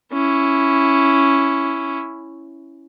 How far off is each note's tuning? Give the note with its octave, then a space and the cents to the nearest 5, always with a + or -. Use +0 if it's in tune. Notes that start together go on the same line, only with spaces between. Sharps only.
C#4 +0 E4 +0